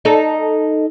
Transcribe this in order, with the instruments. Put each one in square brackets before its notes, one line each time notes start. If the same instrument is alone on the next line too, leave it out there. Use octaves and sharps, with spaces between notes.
[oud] D#4 A4